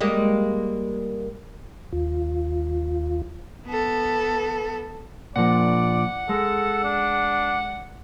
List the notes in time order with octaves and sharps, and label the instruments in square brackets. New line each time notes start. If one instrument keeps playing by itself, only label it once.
[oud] G3 G#3 A#3
[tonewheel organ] D#2 F4
[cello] B3 A4
[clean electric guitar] A#2 F3 [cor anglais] D5 [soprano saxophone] F#5
[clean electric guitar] G#3 [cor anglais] A4
[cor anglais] D4